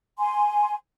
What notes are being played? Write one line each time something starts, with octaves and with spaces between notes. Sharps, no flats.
G#5 C6